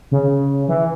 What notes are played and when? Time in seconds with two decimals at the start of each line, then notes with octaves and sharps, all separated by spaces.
0.11 C#3
0.68 E3